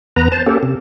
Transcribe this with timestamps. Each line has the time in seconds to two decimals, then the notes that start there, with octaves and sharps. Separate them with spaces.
0.16 E2 B3 B4 A#5
0.32 C5 A5
0.46 A#3 C#4 G4 A4
0.63 C3